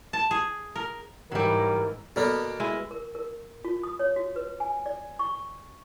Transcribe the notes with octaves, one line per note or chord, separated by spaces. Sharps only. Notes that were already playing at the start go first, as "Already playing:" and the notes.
A5
G#4
A#4
G#2 E3 F#3 G3 A#4
B2 A#3 B3 A4 D5 F6
G#3 E4
A#4
A#4
F4
D#6
C#5
F#4
B4
G#5
D5
C#6